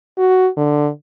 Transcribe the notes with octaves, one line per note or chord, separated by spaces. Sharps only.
F#4
D3